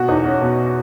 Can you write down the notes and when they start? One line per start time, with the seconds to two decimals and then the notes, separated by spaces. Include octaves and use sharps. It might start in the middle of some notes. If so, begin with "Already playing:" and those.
Already playing: B2 F#4
0.08 E2 D#4
0.25 C#4
0.42 B2